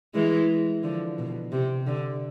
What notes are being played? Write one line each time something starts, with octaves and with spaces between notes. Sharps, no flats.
E3 G#3
D3 F3
B2
C3
D3